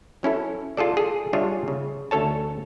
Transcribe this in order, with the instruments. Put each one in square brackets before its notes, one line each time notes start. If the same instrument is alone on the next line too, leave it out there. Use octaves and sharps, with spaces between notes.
[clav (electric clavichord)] F#3 C#4 E4 A4
F4 G#4 A4 D5
G#4 A4
G3 D4 F4 G#4 C#5 E5
C#3
D2 C#4 A4 C#5 A5